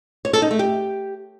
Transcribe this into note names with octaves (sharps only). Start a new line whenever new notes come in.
C#5
A4
D#4
A3
G4